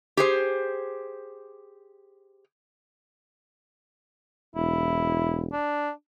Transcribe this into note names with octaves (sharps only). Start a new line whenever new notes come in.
G4 G#4 C5
E1 E4
D4